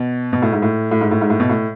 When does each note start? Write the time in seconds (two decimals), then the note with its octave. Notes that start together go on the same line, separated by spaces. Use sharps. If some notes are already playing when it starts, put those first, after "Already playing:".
Already playing: B2
0.33 B2
0.42 A2
0.53 G#2
0.62 A2
0.91 A2
1.01 G#2
1.11 A2
1.21 G#2
1.30 A2
1.40 B2
1.49 A2